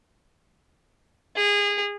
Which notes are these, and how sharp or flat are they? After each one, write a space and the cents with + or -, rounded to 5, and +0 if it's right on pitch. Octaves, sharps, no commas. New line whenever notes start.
G#4 -25